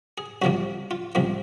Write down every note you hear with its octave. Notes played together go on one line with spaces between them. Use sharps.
G#4
C2 C3 F3 A#3 F#4
F4
C2 C3 F3 A#3